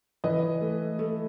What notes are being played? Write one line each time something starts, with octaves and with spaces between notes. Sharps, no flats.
E3 B4 D#5
A3
A3